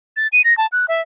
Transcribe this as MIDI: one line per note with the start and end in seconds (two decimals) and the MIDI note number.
0.16 0.27 93
0.32 0.42 99
0.44 0.56 94
0.57 0.67 81
0.72 0.86 90
0.88 1.01 76